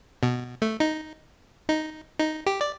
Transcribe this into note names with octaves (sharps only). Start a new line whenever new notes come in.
B2
A3
D#4
D#4
D#4
G4
D5